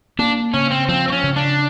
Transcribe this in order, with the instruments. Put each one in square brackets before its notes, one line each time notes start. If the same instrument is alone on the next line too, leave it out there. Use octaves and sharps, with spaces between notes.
[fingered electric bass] A#3 [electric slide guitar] D4
[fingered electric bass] C#3 [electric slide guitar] C#4
[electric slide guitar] C4
[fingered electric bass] F3 [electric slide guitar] C4
[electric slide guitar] C4
C#4
[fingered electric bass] C#3
[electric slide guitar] D4